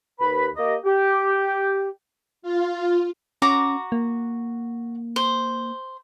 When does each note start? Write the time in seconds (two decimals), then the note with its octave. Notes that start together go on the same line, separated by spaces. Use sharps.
0.20 D#2 B4 B5
0.56 A#3 G4 D#5
0.85 G4
2.42 F4
3.42 C#4 F#4 A#5 D6
3.92 A#3
5.16 C5